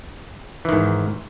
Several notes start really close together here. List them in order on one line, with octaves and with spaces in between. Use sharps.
E3 D#3 G#2